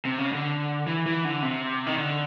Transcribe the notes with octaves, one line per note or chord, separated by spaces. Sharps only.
C3
C#3
D3
E3
E3
D3
C3
D#3
D3